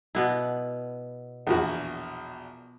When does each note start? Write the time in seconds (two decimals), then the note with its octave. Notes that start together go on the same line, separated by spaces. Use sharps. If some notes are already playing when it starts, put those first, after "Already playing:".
0.15 B2 B3 E4
1.47 A#1 E2 F#4